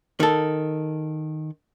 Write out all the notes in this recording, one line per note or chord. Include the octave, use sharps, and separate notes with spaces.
D#3 A4